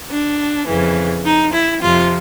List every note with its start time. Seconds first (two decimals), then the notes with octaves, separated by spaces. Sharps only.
0.10 D4
0.67 F2 C#3 E3
1.24 D#4
1.53 E4
1.81 F2 C3 F3 F4